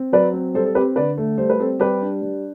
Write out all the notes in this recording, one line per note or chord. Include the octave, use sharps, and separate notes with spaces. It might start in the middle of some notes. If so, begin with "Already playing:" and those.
Already playing: C4
F#3 B4 D5
C4
G3 A4 C5
A4
C4 G4 B4
D3 B4 D5
A3
G3 C5
B4
C4 A4 C5
G3 G4 B4
D4
G3